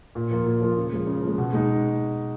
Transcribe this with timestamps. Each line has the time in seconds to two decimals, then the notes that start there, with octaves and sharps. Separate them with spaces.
0.15 A#2
0.31 F3 A#3 F4
0.46 A#2
0.62 F3 A#3 F4
0.77 C#3
0.92 F3 G#3
1.07 C#3
1.23 F3 G#3
1.38 B2
1.53 G#3 D#4